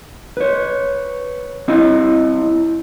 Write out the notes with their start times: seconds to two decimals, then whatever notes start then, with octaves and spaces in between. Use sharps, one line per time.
0.37 B4 C#5
1.68 C4 E4 D#5